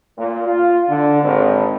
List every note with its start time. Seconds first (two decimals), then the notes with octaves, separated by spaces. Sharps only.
0.18 A#2
0.47 F4
0.89 D3
1.23 G#1